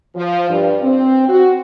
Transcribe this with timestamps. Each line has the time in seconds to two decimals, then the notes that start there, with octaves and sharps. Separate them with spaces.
0.16 F3
0.50 G2
0.82 C4
1.29 F#4